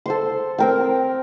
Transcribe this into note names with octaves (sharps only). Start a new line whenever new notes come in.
A4 C5 C6
C4 A#4 G5